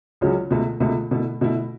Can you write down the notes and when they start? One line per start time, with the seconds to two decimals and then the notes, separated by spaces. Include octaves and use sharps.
0.21 C#2 C#3 F#3 C#4
0.51 C#2 B2 A3
0.80 C#2 B2 A3
1.11 B2 A3 E4
1.41 B2 A3 E4